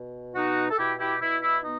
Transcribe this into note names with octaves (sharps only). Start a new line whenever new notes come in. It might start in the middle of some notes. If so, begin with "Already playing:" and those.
Already playing: B2
B2 D#4 F#4
A4
B2 E4 G4
E4 G4
B2 E4
E4
B3 D#4